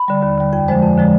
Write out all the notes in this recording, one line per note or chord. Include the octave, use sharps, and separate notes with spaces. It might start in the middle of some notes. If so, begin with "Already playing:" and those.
Already playing: B5
D3 G3
D#2
D3 G3
F2 G5
D3 F3 G#3 C5
F2
D3 F3 G#3